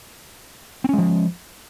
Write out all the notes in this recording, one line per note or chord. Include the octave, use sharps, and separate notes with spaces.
F3 G#3 C4 C#4